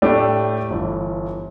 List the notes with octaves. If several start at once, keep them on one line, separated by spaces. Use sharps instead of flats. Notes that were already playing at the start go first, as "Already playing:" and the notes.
A2 A3 D4 G4
G1 G2 E3